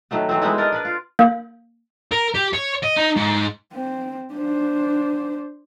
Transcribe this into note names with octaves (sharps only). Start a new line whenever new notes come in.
D#3 F#3 A3 B3
E3 F#3 C4
G#3 B3 D#4 E4
D4 A#4 D5 D#5
D4 B4 D5
F4
A#3
A#4
G4
C#5
D#5
D#4
G#2
C4
D4 C5